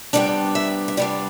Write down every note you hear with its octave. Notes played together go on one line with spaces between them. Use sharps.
C3 G3 B3 D4 D5
E5
E5
C3 G3 B3 D4 D5